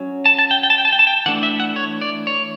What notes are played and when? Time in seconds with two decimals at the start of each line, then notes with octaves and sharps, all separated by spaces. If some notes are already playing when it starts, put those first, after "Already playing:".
Already playing: F#3 C#4
0.26 A5
0.39 A5
0.51 G5
0.63 G5
0.70 A5
0.78 G5
0.85 A5
0.92 G5
0.99 A5
1.07 G5
1.26 E3 A3 D4 F#5
1.43 E5
1.60 F#5
1.76 C#5
2.01 D5
2.27 C#5